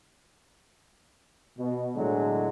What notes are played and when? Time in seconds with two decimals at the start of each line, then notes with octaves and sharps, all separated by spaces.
1.58 B2
1.96 A2 D3 F#3 G#3